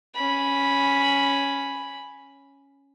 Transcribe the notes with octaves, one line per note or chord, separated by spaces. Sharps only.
C#4 B5